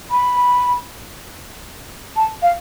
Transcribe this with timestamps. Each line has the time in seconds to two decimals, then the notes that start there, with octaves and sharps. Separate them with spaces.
0.11 B5
2.16 A5
2.42 F5